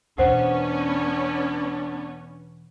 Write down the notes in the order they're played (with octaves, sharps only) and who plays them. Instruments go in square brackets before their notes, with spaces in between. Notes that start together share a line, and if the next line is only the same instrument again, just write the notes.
[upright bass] E2 B2 [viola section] B3 C#4 [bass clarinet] D4 [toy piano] C5 F#5